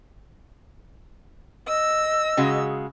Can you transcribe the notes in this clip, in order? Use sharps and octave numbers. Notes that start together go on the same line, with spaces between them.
D#5 E6
C#3 G#3 F#4